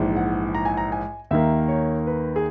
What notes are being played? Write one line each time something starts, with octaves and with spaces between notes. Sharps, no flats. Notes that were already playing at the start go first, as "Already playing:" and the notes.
Already playing: A#1 G#2 E3
F#5
A#5
G#5
A#5
G#5
D#2 D#3 A#3 E5
C#5
B4
G#4